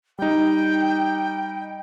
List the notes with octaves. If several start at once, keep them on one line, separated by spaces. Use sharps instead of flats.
G3 D#4 G5